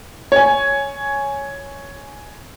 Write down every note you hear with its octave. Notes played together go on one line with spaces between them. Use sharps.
C#5 G#5